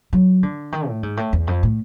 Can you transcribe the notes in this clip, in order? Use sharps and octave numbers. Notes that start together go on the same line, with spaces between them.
F#3
D3
D#3
A2
G#2
A2
E2
F2
A2